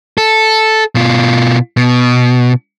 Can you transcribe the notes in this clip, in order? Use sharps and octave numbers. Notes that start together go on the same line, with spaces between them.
A4
B2 F4
B2